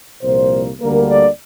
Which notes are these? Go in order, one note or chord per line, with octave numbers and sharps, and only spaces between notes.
C2 A#2 F3 A#3 C5
D2 D3 G3 A#3 A#4
D5